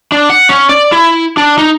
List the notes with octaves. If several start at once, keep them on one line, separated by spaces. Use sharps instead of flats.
D4
F#5
C#4
D5
E4
D4
D#4